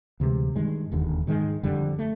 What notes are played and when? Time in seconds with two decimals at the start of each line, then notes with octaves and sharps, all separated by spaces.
0.20 D2 C3 E3 G#3
0.56 G2 D#3 G#3
0.92 E1 D#2 D3
1.27 G#2 D#3 G#3
1.63 G1 F2 D3 G3
1.99 A3